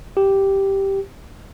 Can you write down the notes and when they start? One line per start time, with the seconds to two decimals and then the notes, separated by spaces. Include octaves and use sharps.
0.17 G4